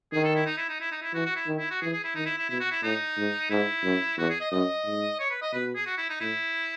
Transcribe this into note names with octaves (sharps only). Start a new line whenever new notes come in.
D#3 G#4
A4
E4
D#4
E4
D#4
E4
D#4
E4
E3 F#4
F#4
E4
D#3
E4
F#4
E3 G#4
G#4
E4
D#3 D#4
E4
E4
B2 E4
F#4
E4
A2 D#4
G#2
G#2 E4
F#2
E2 F#4
G#4
D#5
F#2 D#5
G#2
C#5
B4
D#5
B2 B4
G#4
F#4
E4
D#4
A2 E4